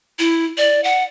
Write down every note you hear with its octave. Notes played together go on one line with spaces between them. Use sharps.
E4
D5
F#5